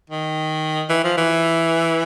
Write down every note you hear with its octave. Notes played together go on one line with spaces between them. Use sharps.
D#3
E3
F3
E3